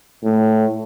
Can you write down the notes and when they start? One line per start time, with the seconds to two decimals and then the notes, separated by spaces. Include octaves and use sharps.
0.24 A2